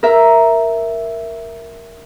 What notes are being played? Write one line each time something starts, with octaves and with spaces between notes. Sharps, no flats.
A#4 E5